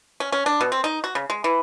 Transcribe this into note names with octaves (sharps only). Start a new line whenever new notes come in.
C#4
C#4
D4
B2
C4
D#4
F#4
C#3
G#3
E3